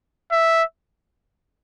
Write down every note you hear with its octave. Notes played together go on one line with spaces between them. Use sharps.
E5